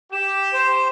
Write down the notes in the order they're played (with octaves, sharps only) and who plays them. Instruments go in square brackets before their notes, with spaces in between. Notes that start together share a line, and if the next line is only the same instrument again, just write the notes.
[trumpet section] G4 [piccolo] E7
[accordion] C5